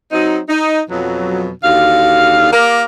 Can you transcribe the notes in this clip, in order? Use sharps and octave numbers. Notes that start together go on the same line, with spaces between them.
F#3 C4 D#4
D#4
F2 B2 F#3
D#2 D3 F#4 F5
A#3 G4 A#4